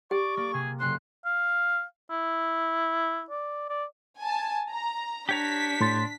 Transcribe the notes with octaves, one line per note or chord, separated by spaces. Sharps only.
G4 D5 C#6
A#3 D5
C3 G#4
F#1 C#4 C5 C6 F#6
F5
E4
D5
D5
G#5 A5
A#5
D4 G4 C#5 A#5 B6
A2 C6 A6